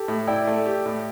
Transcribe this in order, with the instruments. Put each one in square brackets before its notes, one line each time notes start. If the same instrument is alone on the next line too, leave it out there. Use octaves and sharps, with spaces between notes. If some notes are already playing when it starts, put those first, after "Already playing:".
Already playing: [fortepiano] G4 [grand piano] A4
[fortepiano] A2
[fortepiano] E4 [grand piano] D5 G5
[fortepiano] A3
G4
A2